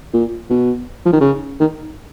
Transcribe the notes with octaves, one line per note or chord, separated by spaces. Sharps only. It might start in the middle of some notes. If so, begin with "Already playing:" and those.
A#2
B2
F3
D#3
C#3
D#3